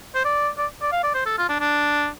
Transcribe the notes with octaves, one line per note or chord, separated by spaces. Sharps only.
C5
D5
D5
D5
F5
D5
C5
A4
F4
D4
D4